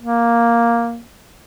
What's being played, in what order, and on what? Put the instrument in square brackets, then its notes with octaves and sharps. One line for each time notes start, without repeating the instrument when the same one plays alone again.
[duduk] A#3